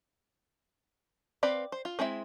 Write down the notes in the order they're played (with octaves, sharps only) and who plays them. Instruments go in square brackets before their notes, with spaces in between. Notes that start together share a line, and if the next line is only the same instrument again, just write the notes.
[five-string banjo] C4 B4 D5 F5
C5
F4
G#3 C4 E4 E5